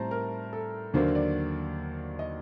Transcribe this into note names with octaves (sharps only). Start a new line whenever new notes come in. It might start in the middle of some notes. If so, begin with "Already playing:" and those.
Already playing: A2 G3 C4 C5 A5 A#5
A#4
A4
D#2 D3 F#3 A#3 D4 C5
D5
D#5